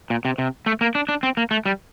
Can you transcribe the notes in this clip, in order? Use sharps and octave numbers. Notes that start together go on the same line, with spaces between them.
A#2
C3
C3
A3
A#3
D4
D4
C4
A#3
A3
G3